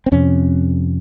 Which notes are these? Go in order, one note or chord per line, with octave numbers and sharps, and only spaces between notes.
C4
F2 C3 C#4